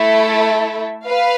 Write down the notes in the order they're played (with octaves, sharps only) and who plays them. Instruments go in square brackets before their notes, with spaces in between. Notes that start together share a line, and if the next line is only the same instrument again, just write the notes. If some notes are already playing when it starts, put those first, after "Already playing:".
Already playing: [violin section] A3 E4 A4 E5
B4 F5